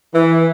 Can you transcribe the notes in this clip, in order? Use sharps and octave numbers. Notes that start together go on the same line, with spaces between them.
E3